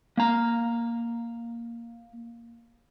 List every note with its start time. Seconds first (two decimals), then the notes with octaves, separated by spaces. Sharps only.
0.17 A#3 A#5